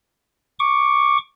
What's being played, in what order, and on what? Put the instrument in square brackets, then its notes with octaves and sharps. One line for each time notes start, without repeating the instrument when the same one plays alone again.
[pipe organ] C#6 D6